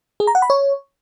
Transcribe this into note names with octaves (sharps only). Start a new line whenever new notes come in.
G#4
A#5
F#5
B5
C#5